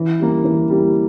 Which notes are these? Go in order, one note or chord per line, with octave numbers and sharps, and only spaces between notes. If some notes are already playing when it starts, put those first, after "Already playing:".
Already playing: E3
G3 A#3
E3
G3 A#3